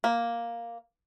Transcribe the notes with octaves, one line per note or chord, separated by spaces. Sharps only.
A#3